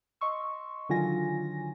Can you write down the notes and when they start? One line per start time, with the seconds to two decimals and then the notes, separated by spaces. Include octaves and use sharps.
0.21 D#5 C6 C#6 E6
0.89 D3 D#3 F#3 F4 G#5 A#6